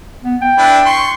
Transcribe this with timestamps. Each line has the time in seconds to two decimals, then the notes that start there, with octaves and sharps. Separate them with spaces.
0.24 B3
0.41 G5
0.58 D4 E4 B4
0.86 C6 C#6